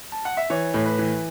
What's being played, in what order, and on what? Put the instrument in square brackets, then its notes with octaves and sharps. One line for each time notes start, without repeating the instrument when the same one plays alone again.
[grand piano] A5
F#5
E5
E3 C#5
A2
B4
E3